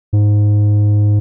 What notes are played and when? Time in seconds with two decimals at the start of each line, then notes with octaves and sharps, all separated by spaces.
0.13 G#2